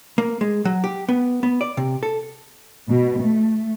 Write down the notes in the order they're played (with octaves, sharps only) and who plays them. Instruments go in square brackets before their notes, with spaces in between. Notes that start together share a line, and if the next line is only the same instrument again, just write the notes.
[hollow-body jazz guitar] A#3
G#3
F#3
G4
B3
B3
D5
C3
A4
[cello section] B2
A3